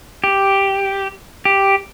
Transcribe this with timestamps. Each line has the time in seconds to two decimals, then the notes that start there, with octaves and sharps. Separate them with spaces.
0.24 G4
1.45 G4